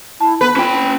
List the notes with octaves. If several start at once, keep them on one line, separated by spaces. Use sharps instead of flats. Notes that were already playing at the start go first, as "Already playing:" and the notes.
E4 A5
B3 B4
C#4 F4 G5